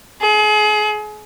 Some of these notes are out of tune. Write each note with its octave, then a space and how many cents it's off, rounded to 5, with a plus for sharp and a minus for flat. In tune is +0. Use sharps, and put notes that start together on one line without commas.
G#4 +35